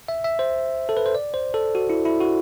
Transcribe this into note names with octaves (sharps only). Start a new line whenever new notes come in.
E5
E5
C5
A4
B4
C5
D5
C5
A4
F#4
E4
E4
F#4